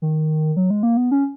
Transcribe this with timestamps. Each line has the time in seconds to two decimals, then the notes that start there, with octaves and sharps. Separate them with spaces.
0.02 D#3
0.57 F#3
0.70 G#3
0.83 A#3
0.97 B3
1.11 C#4